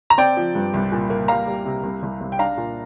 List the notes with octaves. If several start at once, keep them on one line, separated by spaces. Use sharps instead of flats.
A#5
C4 D5 G5
F3
G2
C2
A#2
A#3
G3 F5 A#5
G3
C3
C2
C2
C2
G5
D4 F5 A#5
A#2